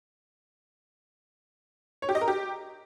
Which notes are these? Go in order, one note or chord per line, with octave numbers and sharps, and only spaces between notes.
C#5
G4
D#5
A#4
G4